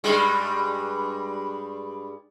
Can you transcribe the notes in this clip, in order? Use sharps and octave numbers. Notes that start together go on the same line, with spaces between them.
G2 G3 G#3